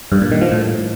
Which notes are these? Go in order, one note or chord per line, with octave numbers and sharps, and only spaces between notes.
G2
A#2
D#3
F3
A2